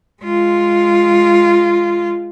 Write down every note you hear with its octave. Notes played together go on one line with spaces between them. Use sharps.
G#3 F4